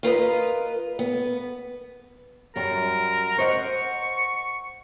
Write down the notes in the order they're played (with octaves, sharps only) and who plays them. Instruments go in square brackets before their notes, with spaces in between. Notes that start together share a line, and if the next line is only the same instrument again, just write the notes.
[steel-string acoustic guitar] F4 A#4 B4 D#5
B3
[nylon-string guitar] F#2 G3 [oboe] A#4
[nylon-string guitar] C5 D#5 F#5 [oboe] C#6